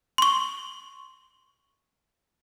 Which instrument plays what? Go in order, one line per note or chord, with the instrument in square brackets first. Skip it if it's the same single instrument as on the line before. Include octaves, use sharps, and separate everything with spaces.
[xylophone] C6 C#6